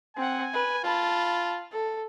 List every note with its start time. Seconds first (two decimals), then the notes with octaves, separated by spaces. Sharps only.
0.17 C4 F#5 G#5
0.53 B4
0.84 F4 A5 B5
1.72 A4